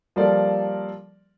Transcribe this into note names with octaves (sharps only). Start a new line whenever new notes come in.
F3 G3 A#3 A4 A#4 D5